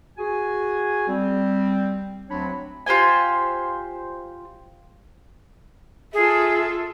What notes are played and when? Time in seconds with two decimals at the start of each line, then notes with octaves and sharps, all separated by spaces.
0.18 F#4 G#4 G#5
1.07 G3 C4
2.29 D2 F#3 C4 D4 C#5 B5
2.86 F4 G4 C5 G#5
6.14 F4 G#4 A4 E5